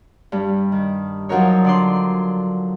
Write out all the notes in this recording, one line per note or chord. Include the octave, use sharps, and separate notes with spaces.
G2 G3
D#3
F3 F#3 D#4 F#4 A#4 C#5
D3 D5 C6